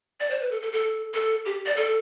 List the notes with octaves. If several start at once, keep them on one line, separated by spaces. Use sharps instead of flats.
D5
C5
B4
A4
A4
A4
A4
G4
D5
A4